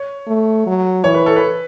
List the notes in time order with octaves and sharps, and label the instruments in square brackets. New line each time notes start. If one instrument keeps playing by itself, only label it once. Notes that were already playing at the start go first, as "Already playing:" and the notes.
Already playing: [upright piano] C#5
[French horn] A3
F#3
[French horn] E3 [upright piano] C#5
[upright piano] B4
A4
B4